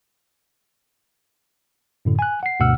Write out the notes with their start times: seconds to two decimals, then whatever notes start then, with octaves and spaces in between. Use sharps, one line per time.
2.05 F#2 A2 D3
2.19 G#5 F#6
2.43 F#5 C7
2.60 D2 G2 B2 F#5 E6 F6